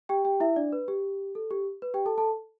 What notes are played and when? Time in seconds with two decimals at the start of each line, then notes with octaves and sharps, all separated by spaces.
0.09 G4 G5
0.25 G4 G5
0.40 E4 E5
0.56 D4 D5
0.72 B4
0.88 G4
1.35 A4
1.51 G4
1.82 B4
1.94 G4 G5
2.06 A4 A5
2.18 A4 A5